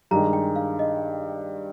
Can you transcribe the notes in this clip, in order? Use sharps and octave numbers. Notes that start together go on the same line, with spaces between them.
G2 D#3 G#3 A#5
G5
F5
D#5